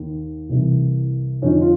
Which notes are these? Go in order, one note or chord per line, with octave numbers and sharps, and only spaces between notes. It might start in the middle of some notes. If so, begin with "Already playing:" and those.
Already playing: D#2 D#3
C2 C3 E3
F2 D3 F3 C#4 D#4
F4